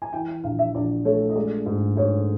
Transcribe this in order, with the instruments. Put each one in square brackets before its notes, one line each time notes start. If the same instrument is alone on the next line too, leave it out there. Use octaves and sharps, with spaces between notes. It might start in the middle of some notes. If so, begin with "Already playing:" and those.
[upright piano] G#5
[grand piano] E3 [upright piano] G5
[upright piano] G5
[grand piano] A#1 [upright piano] F5
[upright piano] E5
[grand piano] A#1 [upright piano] D5
[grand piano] A3 [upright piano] C#5
[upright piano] D#5
[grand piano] G#3 [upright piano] D5
[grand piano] G#2
[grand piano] G#2 [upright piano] C#5